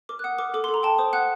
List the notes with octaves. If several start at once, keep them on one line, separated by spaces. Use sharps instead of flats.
A#4 D6
F#6
F#5 D#6
A#4 D6
A4 D6
C6
A4
A#5
G5 A5
C5 D#6
F#5 F#6